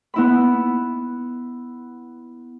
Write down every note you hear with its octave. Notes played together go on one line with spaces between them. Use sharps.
B3 E4 B5